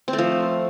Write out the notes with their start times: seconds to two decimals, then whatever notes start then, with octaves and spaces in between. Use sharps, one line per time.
0.08 C4
0.13 A3
0.18 F3